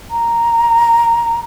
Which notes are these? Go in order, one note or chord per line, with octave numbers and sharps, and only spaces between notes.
A#5